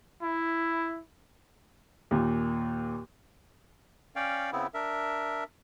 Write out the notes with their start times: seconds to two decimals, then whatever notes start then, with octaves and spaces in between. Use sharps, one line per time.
0.23 E4
2.11 D#2 A#2
4.16 C#4 C#5 D5 F5 G5
4.52 C#3 B3 C4 E4
4.74 D4 A#4 E5